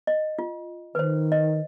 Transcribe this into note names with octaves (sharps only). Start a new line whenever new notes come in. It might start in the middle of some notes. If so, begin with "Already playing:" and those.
D#5
F4
D#3 B4 C5
D#5